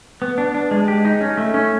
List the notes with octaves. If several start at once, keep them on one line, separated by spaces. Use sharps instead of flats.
B3
D4
D4
G#3
G4
D#4
C#4
A3
C#4